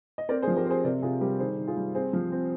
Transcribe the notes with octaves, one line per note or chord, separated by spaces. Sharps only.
D#5
C4 A#4 D5
G#4 C5
F3
G4 A#4
C4 G#4 C5
C3 A#4 D5
C3 F4 G#4
G3 G4 A#4
D#3 G#4 C5
D#3
F4 G#4
G3
C4 G#4 C5
F3
C4